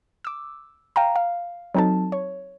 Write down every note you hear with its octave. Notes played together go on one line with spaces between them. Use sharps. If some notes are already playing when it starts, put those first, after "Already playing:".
D6 E6
F5 G5 A#5
F5
F#3 C4 D#4 A4 A5
C#5